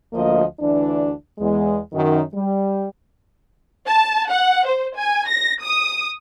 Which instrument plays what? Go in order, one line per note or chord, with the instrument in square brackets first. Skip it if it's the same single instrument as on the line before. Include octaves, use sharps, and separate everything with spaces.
[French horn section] D2 F3 A#3 D#5
D2 E3 D4
E2 G#3
F#2 D#3
G3
[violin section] A5
F#5
C5
G#5
A#6
D#6